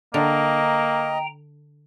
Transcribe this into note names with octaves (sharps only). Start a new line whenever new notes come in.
D3 A#3 D#5 G5 A#5